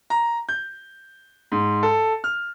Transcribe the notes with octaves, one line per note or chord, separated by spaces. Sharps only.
A#5
G6
G#2
A4
F6